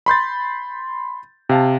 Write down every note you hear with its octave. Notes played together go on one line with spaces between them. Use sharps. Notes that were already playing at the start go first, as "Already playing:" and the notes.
B5 C6 G6 A6
C3 F5 A5